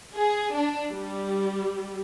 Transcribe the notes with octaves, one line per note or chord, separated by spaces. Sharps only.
G#4
D4
G3